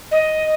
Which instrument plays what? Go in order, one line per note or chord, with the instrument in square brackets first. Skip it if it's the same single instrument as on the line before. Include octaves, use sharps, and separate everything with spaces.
[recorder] D#5